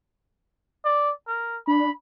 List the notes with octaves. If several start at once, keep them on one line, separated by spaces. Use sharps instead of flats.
D5
A#4
D4 B5